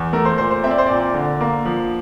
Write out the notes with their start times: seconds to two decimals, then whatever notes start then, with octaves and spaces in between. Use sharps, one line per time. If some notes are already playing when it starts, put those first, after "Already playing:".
Already playing: E2
0.13 A3 A#4
0.25 C5
0.38 A#2 C5
0.51 C5
0.64 C4 E5
0.71 D5
0.78 C5
0.86 A#2 D5
1.14 D3
1.41 A#3
1.65 F3